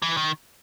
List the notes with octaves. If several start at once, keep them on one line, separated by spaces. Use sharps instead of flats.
E3
D#3